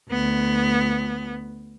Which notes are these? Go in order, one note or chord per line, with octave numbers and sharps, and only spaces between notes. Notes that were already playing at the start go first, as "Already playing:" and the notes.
D2 B3